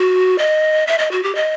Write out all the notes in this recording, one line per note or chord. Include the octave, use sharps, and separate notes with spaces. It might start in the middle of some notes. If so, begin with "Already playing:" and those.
Already playing: F#4
D#5
E5
D#5
F#4
G4
D#5